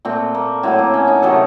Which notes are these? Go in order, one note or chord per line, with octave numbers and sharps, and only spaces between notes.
A#2 A3 C4
A#3
A2 F#3 A3 C4
A#3
C#4
D#4
C3 D#3 F#3 A3 A4